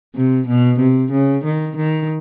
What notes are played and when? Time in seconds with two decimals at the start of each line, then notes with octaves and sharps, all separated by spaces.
0.15 C3
0.47 B2
0.79 C3
1.12 C#3
1.44 D#3
1.76 D#3